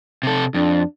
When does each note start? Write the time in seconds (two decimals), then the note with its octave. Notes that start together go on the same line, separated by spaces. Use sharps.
0.23 C3 A4
0.55 F2 D4